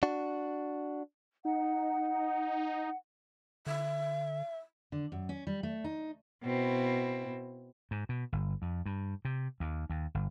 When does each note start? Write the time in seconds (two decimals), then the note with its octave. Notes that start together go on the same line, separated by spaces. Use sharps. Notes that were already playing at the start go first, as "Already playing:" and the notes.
0.03 D4 F#4
1.45 D#4 F#5
3.67 D3 E5
4.92 D3
5.12 F#2
5.29 C#4
5.47 G3
5.63 A3
5.84 D#4
6.45 B2 C4 E4
7.91 G#2
8.09 B2
8.32 G1
8.62 F2
8.86 G2
9.25 C3
9.60 D#2
9.90 D#2
10.15 G1